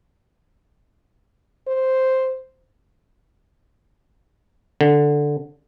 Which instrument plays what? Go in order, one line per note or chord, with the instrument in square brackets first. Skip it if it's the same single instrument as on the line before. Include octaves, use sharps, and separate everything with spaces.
[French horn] C5
[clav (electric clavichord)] D3